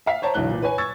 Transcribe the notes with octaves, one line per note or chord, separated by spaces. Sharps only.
E5 F5 B6
C5 C#5 A5 A#5
B1 D3 E3 F#3 F#6 G7
A#2 E3
B4 C#5 G#5
C#6 E6 G#6 A6